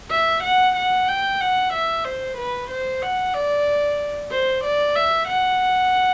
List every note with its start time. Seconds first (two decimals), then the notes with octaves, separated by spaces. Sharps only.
0.10 E5
0.43 F#5
0.76 F#5
1.08 G5
1.41 F#5
1.73 E5
2.05 C5
2.37 B4
2.70 C5
3.03 F#5
3.34 D5
4.31 C5
4.64 D5
4.95 E5
5.28 F#5